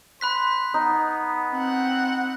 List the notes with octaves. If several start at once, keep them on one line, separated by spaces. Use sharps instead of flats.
C5 B5 F#6 B6
B3 D#4
C4 F#5